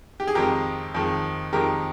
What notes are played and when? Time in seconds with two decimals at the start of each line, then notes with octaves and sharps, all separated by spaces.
0.20 G4
0.27 G#4
0.35 F2 D#3 G#3 G4 A#4
0.94 F2 D#3 G#3
1.53 F2 D#3 G#3 G4 A#4